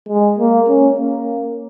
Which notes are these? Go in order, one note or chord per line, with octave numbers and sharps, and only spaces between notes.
G#3
A#3
C#4
A#3